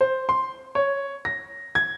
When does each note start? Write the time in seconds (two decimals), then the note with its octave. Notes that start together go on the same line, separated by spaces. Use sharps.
0.01 C5
0.29 C6
0.75 C#5
1.25 A#6
1.75 G#6